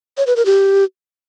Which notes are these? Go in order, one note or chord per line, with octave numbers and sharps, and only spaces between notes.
C#5
B4
A#4
G4